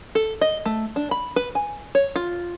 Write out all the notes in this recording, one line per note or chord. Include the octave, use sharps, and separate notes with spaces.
A4
D#5
A3
D4
B5
B4
G#5
C#5
F4